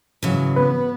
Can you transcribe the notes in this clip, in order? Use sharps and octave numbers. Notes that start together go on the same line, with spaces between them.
G#2 C#3 E3 F#3
B3 B4